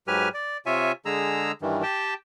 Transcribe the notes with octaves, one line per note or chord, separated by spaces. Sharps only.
G#2 F#3 G4 B4 G#5 F6
D5
C3 F4 C#5 E5 G#5
D3 G#3 G#4 A#5 E6
G2 D#3 E3
G4 G5 A5